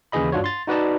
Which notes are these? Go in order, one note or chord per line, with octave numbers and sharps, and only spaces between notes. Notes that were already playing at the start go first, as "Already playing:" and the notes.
D#2 C#3 E3 G#4 D#5 B5
G2 D4 F4 F#4 C#5
C6 A6
D#4 F#4 B4 D5 D#5 A5